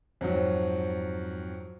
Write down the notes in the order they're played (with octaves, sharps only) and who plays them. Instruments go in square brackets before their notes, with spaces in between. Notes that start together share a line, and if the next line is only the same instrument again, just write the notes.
[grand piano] F2 G#2 F#3